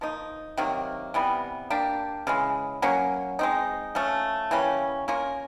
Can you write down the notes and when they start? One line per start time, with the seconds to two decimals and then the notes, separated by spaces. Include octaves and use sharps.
0.01 F3 A#3 D#4
0.57 C3 D#3 F#3 A#3
1.14 C3 E3 G3 B3
1.70 A#3 D4 G4
2.27 C#3 E3 G#3
2.82 F#3 A#3 C#4
3.39 G#3 C4 D#4
3.95 F3 A3 C#4
4.51 E3 G3 A#3 C#4
5.08 A#3 C#4 F4 A#4